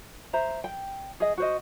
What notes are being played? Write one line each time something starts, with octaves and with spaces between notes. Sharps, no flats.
C5 E5 A#5
G5
G#4 D#5
F#4 C5 D#5